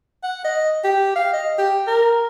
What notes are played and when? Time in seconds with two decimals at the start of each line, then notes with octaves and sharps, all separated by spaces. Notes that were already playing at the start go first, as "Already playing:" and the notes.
0.23 F#5
0.45 D#5
0.84 G4
1.16 F5
1.33 D#5
1.58 G4
1.87 A#4